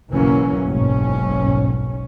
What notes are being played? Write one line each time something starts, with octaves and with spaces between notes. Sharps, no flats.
F#1 B1 E3 F#3 A#3 C#4
F#1 B1 G#2 C#4